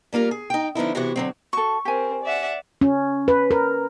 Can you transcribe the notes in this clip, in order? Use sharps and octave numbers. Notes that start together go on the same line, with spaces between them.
G3 A#3 F4 A#4
G#4
D#4 G5
D3 F3 B3 D#4 E4
C3 E3 B3 E4 F#4
D3 F#3 C4
F#4 A4 C#6
C4 G4 A#4 G#5
D5 E5 F#5
C#4
B4
A#4